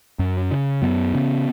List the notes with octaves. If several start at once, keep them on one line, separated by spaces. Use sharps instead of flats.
F#2
C#3
F#2 B3
C#3